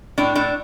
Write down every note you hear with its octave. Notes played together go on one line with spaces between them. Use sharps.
A2 D4
A2 D4